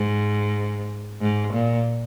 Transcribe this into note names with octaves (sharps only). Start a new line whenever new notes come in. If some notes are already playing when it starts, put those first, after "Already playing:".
Already playing: G#2
G#2
A#2